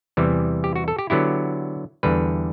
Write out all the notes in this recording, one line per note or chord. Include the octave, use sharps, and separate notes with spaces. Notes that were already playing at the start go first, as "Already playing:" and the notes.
E2 C3 E3 G3
G4
F#4
A4
G4
D3 F#3 B3 E4 G4
E2 D3 G3 B4